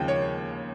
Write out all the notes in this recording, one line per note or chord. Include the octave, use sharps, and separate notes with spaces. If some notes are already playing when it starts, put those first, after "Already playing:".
Already playing: D#2 C#3 F3 G#3 G5
C#5